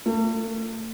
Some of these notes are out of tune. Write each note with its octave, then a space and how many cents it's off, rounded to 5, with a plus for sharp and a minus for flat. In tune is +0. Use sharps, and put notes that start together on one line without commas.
A3 +40